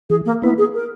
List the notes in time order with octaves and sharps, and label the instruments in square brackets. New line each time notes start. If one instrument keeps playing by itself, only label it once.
[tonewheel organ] E3 [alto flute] G#4
[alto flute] A#3
[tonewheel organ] A#3 E4 B4 [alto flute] B3
[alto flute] G#4
A#4